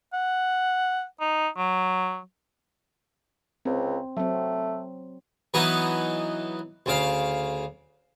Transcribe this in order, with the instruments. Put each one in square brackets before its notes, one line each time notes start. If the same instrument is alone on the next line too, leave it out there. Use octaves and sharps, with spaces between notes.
[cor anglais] F#5
D#4
F#3
[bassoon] C#2 [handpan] C4
[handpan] F#3 C4 [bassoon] A3
[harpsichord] E3 F#3 B3 D#4 B4 D#5
D2 C#3 F5